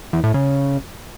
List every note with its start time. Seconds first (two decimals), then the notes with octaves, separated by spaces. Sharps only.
0.13 E2
0.24 A2
0.34 C#3